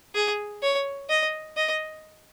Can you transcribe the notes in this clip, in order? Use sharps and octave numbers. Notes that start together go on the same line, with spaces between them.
G#4
C#5
D#5
D#5